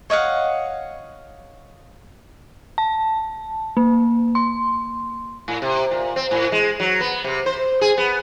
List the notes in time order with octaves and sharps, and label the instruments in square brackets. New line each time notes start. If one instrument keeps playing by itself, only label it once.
[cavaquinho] C#5 D#5 F5 F#5
[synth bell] A5
A#3
C6
[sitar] A2
C3
A#2
C4
A2
G#3
F#3
B3
C3
C5
G#4
B3